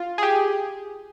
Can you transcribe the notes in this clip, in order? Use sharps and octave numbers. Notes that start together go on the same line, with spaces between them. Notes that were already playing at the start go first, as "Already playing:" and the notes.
Already playing: F4
G#4
G4